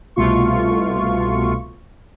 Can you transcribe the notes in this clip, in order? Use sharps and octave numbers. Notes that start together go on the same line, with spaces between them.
C2 B2 A3 F4 C#6